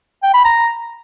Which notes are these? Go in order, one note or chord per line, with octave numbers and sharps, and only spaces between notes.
G5
B5
A#5